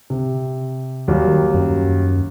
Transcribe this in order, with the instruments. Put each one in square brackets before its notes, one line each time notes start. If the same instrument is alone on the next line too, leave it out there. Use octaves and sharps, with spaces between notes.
[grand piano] C3
D#2 F#3 G3
[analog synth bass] D#3
F#2